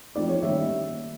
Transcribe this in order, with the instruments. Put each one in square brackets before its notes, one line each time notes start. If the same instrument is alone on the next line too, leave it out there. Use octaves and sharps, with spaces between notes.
[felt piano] F3 A3 C4 D#4 D5
C#5
D#3 G3 A#3 C#4 E5